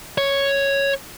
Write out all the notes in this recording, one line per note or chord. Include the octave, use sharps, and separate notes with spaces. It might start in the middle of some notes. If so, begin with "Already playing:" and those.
C#5